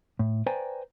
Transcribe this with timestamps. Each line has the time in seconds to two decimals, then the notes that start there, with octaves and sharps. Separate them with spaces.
0.19 A2
0.46 B4 C5 D5 G5 G#5 A#5